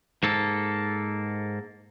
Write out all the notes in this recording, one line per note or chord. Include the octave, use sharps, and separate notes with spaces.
G#2 A#3 A4